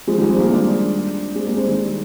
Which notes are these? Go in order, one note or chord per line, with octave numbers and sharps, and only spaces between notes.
F3 G#3
D#3 G3
G#3 C4
G3 A#3
A#3 D4
G#3 C4
G3 A#3
G#3 C4
D#3 G3